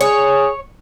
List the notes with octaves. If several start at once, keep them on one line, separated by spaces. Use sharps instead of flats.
G#4 C#5